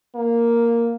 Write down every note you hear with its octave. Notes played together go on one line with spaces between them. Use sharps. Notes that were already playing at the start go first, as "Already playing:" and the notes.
A#3